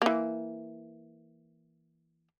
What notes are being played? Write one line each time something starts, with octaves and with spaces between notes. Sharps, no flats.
E3 A#3